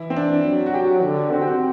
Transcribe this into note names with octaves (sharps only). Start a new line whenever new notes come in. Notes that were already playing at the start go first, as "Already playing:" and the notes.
Already playing: E3 E4
C4
D4
F#3
F#4
G4
D3
C4 F#4
G4
F#4